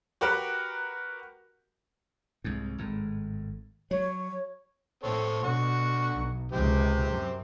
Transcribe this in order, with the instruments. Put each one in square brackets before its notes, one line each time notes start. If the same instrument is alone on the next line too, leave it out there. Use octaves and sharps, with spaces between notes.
[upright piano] F#4 G4 A#4 B4
[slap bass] C2 G#2
G#1 A2
[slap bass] F#3 [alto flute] C#5
[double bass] A2 [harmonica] C4 A4 C#5
[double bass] B2 [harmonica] D3 F#4 C#6
[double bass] B1
[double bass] C#2 C3 [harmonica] C4 G4
[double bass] F#2